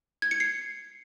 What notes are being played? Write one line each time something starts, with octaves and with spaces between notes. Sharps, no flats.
G#6
C#7
C7